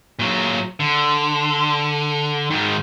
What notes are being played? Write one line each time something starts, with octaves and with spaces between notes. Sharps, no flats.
A#2 F#3
D3
G#2 D#3